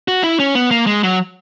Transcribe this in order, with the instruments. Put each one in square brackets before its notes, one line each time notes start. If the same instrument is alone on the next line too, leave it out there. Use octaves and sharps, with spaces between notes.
[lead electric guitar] F#4
E4
C#4
B3
A#3
G#3
F#3